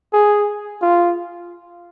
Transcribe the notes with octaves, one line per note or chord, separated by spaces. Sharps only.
G#4
F4